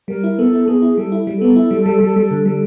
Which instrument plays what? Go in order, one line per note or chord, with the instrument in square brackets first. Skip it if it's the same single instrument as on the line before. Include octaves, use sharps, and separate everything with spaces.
[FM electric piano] G3 [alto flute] A#4
[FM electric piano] E4
[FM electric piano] B3 [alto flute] A4
[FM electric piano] E4
[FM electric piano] B3 [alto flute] G#4
[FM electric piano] E4
[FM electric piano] G3 [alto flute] A4
[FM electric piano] E4
G3
[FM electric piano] B3 [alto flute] A4
[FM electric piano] E4
G3
G3
G3
G3
D3
G3